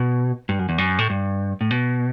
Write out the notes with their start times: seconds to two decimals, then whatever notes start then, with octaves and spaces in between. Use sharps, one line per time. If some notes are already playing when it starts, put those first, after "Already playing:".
Already playing: B2
0.49 G2
0.59 F#2
0.69 E2
0.78 F#2
0.99 A2
1.10 G2
1.61 A2
1.71 B2